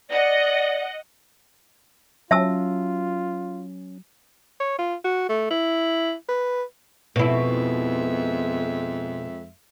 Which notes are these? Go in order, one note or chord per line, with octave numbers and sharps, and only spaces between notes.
D5 D#5 F#5
F#3 C#4 F4 E5 A5 E6
C#5
F4
F#4
A3
E4
B4
F2 B2 G#3 E4 E5